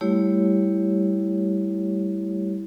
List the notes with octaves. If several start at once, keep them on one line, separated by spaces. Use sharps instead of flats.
G3 A3 E4 G4 C#5